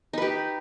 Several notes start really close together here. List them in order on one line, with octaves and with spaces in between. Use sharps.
D#4 B4 G4